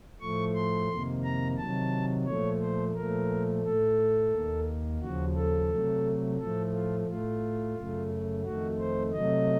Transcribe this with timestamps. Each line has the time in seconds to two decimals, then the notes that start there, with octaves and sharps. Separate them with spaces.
0.20 A2 F3 A3 C#6
0.54 C6
0.89 F2 C3 D#3 A#3
1.24 A#5
1.57 C3 D#3 F#3 A5
2.25 A#2 F3 A3 C#5
2.60 C5
2.94 A#2 F3 A3 A#4
3.64 A2 A3 A4
4.31 D#2 D#3 A#3
5.01 D#2 C#3 F3 F#4
5.35 A4
5.69 C3 F#3 A3
6.38 A2 F3 A3 A4
6.72 F4
7.07 A2 A3 F4
7.76 F#2 C#3 A3
8.43 F2 D#3 A3 F#4
8.79 C5
9.13 C3 F#3 A3 D#5